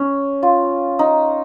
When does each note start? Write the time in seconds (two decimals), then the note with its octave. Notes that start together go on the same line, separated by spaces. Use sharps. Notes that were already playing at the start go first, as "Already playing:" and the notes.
Already playing: C#4
0.43 F4
0.99 D#4